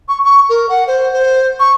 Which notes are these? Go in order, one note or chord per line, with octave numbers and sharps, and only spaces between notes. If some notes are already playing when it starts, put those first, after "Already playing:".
C#6
C#6
A#4
F#5
C5
C5
C#6